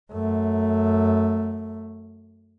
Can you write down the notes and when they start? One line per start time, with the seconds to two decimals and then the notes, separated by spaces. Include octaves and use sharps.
0.12 F#2 A3